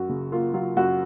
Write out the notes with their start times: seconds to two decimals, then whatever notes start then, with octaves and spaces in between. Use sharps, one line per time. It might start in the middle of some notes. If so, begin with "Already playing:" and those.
Already playing: F#2 F#3 F#4
0.09 C#3
0.32 A#3 F4
0.54 F#3 F4
0.77 F#2 F#4